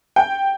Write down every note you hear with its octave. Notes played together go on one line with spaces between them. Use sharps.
G5